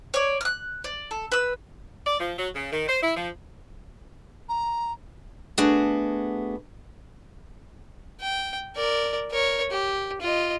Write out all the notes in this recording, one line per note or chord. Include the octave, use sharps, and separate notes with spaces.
C#5 D5
F6 F#6
D5
A4
B4 E6
D5
F3
F#3
C#3
D#3
C5
E4
F3
A#5
A3 B3 D4 F#4 G#4
G5
A#4 D5
A#4 C#5
G4
F4 D#5